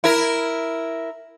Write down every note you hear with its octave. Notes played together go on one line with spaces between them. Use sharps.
E4 A#4